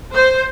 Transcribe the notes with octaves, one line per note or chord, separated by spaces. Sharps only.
C5